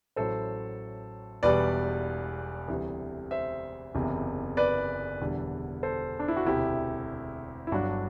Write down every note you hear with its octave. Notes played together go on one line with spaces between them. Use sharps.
A1 A2 F#3 A4 C5
E1 E2 B2 G3 B4 D5
D2 C3 E3 G3
C5 E5
F#1 E2 C3
B4 D5
E1 E2 D3 G3
A4 C5
D4
E4
F#4
E1 D2 C3 E4 G4
E4
G1 G2 F#3 D4 F#4